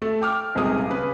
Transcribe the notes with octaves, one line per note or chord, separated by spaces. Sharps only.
A3 A4
G5 D6 F6
D#1 C#2 C3 G#4 D#6
C#3 B4